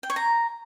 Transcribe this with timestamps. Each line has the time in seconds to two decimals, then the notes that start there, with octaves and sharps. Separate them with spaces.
0.03 G5
0.10 C#5
0.16 A#5